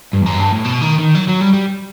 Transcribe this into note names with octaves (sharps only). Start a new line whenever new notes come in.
G2
E2
F#2
G2
A2
B2
D#3
D#3
F#3
F#3
G3
G3